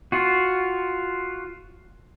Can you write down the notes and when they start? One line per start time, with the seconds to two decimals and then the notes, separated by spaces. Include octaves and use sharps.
0.12 F4 F#4